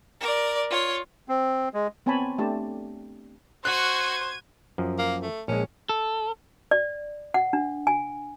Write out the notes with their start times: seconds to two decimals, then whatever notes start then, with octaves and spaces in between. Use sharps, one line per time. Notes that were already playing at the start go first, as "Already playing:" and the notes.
0.21 A#4 D5
0.70 F4 C#5
1.29 C4
1.74 G#3
2.06 B3 C4 C#5 G#5 A5 B5
2.38 A3 D4 G4 A5
3.65 F#4 C5 C#6 F#6 G#6 D#7
4.78 F#2 F3
4.99 A#3
5.22 A3
5.48 A#1 G#3 C#4
5.89 A4
6.71 D5
7.34 F#5
7.53 D4
7.87 G#5